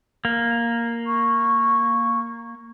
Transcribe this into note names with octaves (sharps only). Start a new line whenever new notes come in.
A#3
C#6